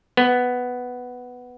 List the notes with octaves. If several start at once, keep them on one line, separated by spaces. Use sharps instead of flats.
B3